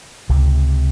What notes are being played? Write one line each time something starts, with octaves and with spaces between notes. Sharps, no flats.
C#2 C3